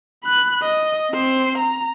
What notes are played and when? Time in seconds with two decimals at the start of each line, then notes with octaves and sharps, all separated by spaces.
0.24 B5 F#6
0.63 D#5
1.11 C4 C5
1.58 A#5